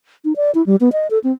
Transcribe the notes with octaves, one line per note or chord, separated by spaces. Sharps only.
D#4
D5
E4
G3
B3
D#5
A4
C4